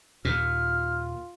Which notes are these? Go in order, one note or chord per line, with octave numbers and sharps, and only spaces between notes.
D#2 A#2 F4 F6